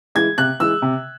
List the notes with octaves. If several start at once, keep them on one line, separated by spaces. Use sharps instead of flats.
E3 G#3 G#6
C3 F#6
E3 G#3 E6
C3